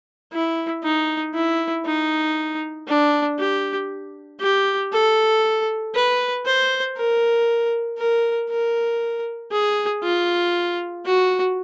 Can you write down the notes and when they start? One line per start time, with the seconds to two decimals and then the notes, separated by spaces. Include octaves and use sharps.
0.32 E4
0.83 D#4
1.34 E4
1.86 D#4
2.88 D4
3.39 G4
4.41 G4
4.92 A4
5.94 B4
6.46 C5
6.97 A#4
7.98 A#4
8.50 A#4
9.52 G#4
10.03 F4
11.05 F#4